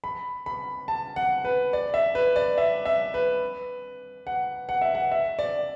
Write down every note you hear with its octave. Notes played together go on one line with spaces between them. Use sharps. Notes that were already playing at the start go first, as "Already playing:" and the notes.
B5
B5
A5
F#5
B4
D5
E5
B4
D5
E5
E5
B4
F#5
F#5
E5
F#5
E5
D5